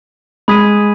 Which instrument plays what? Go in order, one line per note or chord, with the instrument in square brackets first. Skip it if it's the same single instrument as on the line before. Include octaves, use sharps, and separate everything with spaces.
[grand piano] G#3 [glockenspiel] B5 D#6 G#6 B6 D#7